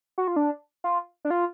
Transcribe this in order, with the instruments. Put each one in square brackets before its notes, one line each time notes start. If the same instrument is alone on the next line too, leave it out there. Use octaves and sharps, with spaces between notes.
[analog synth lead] F#4
F4
D4
F4
D4
F4